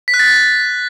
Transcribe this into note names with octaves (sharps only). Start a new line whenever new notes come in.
B6
F#6
A6